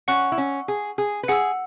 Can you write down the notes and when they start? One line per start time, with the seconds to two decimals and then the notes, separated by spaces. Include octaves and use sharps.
0.08 C#4 F#5 C#6 F#6
0.32 E4
0.38 C#4
0.68 G#4
0.98 G#4
1.23 B4
1.28 G#4 F#5 E6